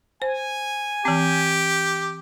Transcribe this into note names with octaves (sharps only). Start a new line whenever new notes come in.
C5 G#5
E3 C4 G4